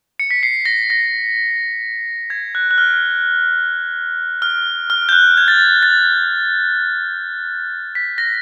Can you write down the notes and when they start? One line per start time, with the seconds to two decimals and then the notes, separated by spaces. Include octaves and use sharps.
0.20 C#7
0.31 B6
0.43 C7
0.66 A#6
0.90 A#6
2.30 G#6
2.55 F#6
2.71 F#6
2.78 F6
4.42 F6
4.90 F6
5.09 G6
5.12 F#6
5.37 G#6
5.48 A6
5.83 A6
7.95 B6
8.18 A#6